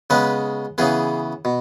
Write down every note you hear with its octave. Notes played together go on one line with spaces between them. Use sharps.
C#3 G#3 B3 B4
C#3 E3 B3 G#4
B2